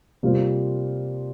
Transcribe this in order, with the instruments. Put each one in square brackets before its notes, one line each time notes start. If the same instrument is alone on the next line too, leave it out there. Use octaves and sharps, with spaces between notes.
[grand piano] C3 G3 A#3 F4 C5